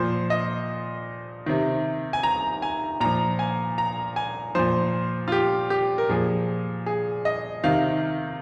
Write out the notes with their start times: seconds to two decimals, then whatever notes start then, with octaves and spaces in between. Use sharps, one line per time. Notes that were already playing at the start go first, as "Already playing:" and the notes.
Already playing: A#2 F3 C5
0.30 D#5
1.46 C3 D#3
2.13 G#5
2.23 A#5
2.62 G#5
3.00 A#2 F3 A#5
3.39 G#5
3.78 A#5
4.16 G#5
4.55 A#2 F3 C5
5.28 F4
5.32 G4
5.70 G4
5.98 A#4
6.09 A#2 F3 G#4
6.86 G#4
7.25 D#5
7.64 C3 D#3 F5